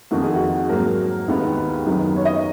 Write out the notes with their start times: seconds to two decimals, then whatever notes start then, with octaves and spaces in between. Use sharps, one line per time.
0.11 F2 D#3 A#3 F#4
0.22 G#4
0.34 F#4
0.69 G#2 F#3 A#3 A#4
1.28 D#2 D#3 G#3 B3
1.87 F#2 D#3 F#3 B3
2.16 C#5
2.25 D#5